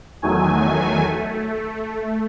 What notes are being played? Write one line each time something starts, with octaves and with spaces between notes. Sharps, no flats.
E2 D#3 F#3 A3 G#5
A3